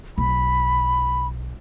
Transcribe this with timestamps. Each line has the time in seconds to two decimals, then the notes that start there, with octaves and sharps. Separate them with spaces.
0.18 B1 B5